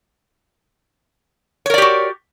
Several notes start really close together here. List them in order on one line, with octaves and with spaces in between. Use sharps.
C#5 A#4 D5 G4 F#4